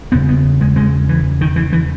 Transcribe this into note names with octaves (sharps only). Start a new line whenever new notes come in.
E2 C#3 B3
B3
G#3
G#3
E3
D#3
E3
E3